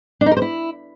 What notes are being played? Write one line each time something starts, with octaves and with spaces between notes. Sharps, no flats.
D4
D#4
A#4
C5
E4